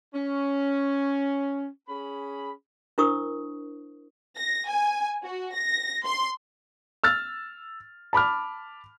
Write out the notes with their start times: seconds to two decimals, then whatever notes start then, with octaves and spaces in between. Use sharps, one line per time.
0.14 C#4
1.88 C#4 G#4 B5
2.98 D4 E4 A#4 C5 C#6 D#6
4.36 A#6
4.68 G#5
5.24 F#4
5.54 A#6
6.06 C6
7.04 E6 F6 A6
8.13 A5 B5 D6 F6